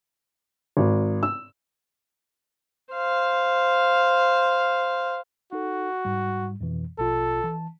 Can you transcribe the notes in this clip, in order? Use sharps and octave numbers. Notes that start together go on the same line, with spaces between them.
G#1
E6
C5 F5
D#4 F#4 A4
G#2 G3
F2 B2 E3
A#1 B2 F4 A4
E3 A5